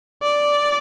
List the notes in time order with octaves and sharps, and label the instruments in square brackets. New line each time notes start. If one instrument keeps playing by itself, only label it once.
[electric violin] D5